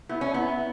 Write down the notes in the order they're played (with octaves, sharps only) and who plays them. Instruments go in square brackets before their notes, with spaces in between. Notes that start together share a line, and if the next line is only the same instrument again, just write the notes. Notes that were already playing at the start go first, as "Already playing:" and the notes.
[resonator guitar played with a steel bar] B3 [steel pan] E4
[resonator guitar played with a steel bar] C#4
[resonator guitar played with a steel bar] B3 [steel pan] E4